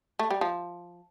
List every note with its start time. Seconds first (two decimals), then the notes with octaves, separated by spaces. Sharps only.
0.19 A3
0.30 G3
0.41 F3